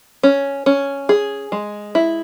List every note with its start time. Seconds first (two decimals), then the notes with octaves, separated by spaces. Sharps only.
0.23 C#4
0.66 C#4
1.09 G#4
1.52 G#3
1.95 E4